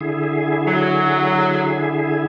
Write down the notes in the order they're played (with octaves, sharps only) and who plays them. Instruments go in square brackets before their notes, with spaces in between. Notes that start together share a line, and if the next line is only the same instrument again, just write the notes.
[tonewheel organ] D3 E4 G#4
[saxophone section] F#3